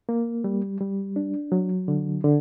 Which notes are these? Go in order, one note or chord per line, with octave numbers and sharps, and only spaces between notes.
A#3
G3
G3
D4
F#3
D3
D3